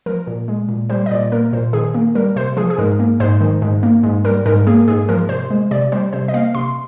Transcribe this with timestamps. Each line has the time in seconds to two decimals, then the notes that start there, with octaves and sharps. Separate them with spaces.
0.06 F3 A#4
0.27 A#2
0.48 G#3
0.69 A#2
0.90 G3 C5
1.06 D#5
1.11 A#2 D5
1.32 A#3 A#4
1.53 A#2 C5
1.73 D#3 G#4
1.95 A#3
2.15 G3 A#4
2.36 C3 C5
2.57 F3 G#4
2.70 G#4
2.78 G#2 A#4
3.00 A#3
3.20 G#2 C5
3.41 D#3
3.62 G#2
3.83 A#3
4.03 G#2
4.25 G3 A#4
4.46 G#2 A#4
4.67 A#3 G#4
4.88 G#2 G#4
5.09 F3 A#4
5.29 C3 C5
5.50 G#3
5.71 C3 D5
5.92 G3 C5
6.13 C3 C5
6.28 D#5
6.34 A#3 F5
6.55 C3 C6